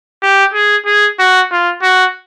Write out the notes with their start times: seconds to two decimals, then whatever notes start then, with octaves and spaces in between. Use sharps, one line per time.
0.22 G4
0.54 G#4
0.86 G#4
1.19 F#4
1.51 F4
1.83 F#4